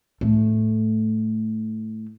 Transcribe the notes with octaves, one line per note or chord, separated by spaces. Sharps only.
A2 A3